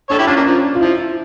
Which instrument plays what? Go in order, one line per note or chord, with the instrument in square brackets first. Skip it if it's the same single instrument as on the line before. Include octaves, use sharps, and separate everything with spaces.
[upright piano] D4 [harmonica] A4 C#5
[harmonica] E4 G4
[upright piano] C#4 [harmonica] D4 F4
[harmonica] A#3
[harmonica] F3 [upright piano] D4
[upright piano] F4
[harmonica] F3 [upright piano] E4